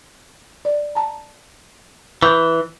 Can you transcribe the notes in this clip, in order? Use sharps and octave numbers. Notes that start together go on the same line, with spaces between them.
D5
A5 A#5
E3 C#6 D#6 G6